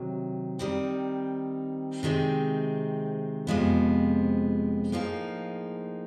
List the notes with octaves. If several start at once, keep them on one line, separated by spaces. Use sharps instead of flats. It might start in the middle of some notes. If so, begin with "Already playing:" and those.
Already playing: C3 D#3 F#3
D#3 G3 C4 D#4
C3 D#3 G#3 C4
F2 C3 F3 G#3 B3
A2 F3 A#3 D#4 G#4